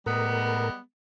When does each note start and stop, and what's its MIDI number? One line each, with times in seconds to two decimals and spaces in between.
0.06 0.70 45
0.06 0.79 55
0.06 0.79 56
0.06 0.79 59
0.06 0.70 70